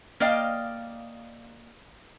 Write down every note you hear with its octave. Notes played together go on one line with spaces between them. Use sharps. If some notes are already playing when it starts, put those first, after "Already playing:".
A#3 D5 D#5 F5 G5